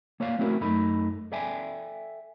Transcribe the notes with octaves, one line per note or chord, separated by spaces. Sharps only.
A#3 C#5 D5 F5
A3 C4 C#4 E4 F#4 A#4
F#2 A3 D#4 B5
A4 D5 E5 G5 G#5